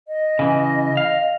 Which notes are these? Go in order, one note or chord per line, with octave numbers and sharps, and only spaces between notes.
D#5
C#3 E3
F5